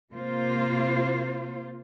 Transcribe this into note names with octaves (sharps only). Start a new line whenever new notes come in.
C3 A#3 F4 C5